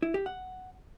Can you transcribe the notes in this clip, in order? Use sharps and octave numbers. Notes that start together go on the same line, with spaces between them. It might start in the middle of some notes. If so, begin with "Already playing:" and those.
E4
G4
F#5